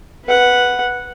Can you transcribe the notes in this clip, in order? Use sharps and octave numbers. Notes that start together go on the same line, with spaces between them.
B4 F#5